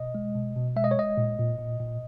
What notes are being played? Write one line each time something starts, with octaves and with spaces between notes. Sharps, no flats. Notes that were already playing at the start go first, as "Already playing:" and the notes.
Already playing: B2 D#5
G#3
B2
B2
G#3 E5
D#5
C#5
G#3 D#5
A#2
A#2
A#2
A#2